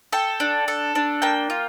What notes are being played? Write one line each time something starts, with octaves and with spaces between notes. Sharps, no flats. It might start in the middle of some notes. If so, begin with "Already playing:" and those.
A4 G5
D4
A4
D4
A#3 G5
F4